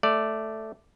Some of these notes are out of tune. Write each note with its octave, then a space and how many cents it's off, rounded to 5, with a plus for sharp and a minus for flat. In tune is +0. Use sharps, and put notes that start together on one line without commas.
A3 +0 D5 +0